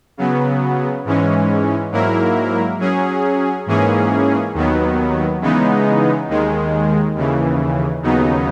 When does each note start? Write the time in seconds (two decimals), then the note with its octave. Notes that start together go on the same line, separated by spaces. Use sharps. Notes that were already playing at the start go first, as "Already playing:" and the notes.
0.17 C#3 F#3 B3
1.05 G#2 E3 G#3 C#4
1.92 G#2 F#3 A#3 E4 A#4
2.79 F#3 C#4 G#4
3.66 G#2 E3 A#3 C#4 G#4
4.54 D#2 D#3 F#3 B3
5.41 C#3 E3 G#3 B3 D#4
6.28 D#2 D#3 G#3
7.15 D#2 C#3 E3
8.03 D#2 C#3 F#3 B3 D#4